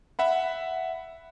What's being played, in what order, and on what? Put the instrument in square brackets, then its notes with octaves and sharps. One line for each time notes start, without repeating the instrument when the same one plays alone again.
[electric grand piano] E5 F#5 B5